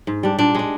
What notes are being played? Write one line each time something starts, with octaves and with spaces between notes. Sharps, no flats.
G#2
G3 D4
A#2 D4
G#3 D4